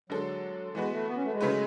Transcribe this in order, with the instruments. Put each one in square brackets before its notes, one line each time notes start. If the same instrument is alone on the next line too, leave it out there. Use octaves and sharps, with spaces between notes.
[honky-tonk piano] D3 G#3 D4 A4 [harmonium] F#3
[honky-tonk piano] E3 B3 F#4 B4 [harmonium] G#3
[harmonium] A3
B3
C#4
A3
G#3
[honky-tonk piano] C#3 F#3 A3 E4 B4